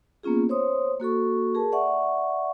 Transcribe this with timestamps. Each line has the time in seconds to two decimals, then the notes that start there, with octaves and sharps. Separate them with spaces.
0.23 A#3 B3 C#4 F4 G#4
0.49 C5 C#5 C6 D#6
1.00 A#3 F#4 A4 C#6
1.55 G#4 A#4 A5
1.72 D5 E5 F#5 C#6